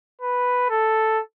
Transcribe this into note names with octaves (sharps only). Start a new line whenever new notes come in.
B4
A4